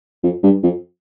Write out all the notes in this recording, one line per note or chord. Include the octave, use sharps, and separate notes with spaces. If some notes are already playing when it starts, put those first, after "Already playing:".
F2
G2
F2